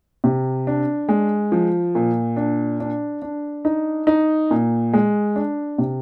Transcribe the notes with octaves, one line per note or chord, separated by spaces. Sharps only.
C3
D4
G#3
F3
A#2
D4
D4
D4
D#4
D#4
A#2
G#3
D4
C3